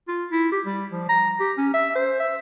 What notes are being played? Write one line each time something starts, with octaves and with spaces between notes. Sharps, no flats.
F4
E4
G4
G3
F3
A#5
G4
C#4
E5
C5
E5